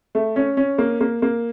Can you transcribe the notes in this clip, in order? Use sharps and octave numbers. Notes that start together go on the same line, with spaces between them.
A3
C#4
C#4
A#3
A#3
A#3